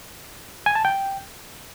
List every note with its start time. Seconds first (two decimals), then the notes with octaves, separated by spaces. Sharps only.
0.66 G#5
0.75 A5
0.85 G5